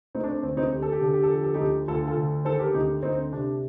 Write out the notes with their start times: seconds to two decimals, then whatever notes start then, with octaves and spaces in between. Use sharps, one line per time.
0.15 A3 C4 D#4
0.24 D4
0.29 C4
0.43 D2 C4
0.57 C4 D#4
0.72 D2 G4
0.82 A4
0.92 G4
1.01 D3 A4
1.14 G4
1.23 A4
1.30 F3 G4
1.44 A4
1.54 D2 D#4 G4
1.88 D2 F4 A4
2.07 F4 A4
2.16 D3
2.45 D#3 A4 C5
2.59 G4 A#4
2.74 D2 D#4 G4
3.03 D2 C4 D#4
3.32 C3 D4